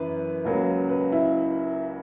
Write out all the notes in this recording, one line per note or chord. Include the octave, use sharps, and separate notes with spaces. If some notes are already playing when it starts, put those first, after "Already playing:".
Already playing: F#2 E3 B4
C#2 C#3 F#3 A#3
B4
E4